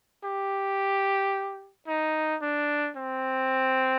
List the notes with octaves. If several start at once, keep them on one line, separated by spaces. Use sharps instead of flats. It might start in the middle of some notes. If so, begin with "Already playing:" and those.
G4
D#4
D4
C4